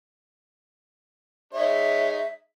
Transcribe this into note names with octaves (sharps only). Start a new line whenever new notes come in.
G#3 D#4 C#5 E5